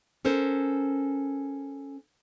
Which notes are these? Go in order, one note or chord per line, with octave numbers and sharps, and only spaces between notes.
C#4 A4 A#4 C5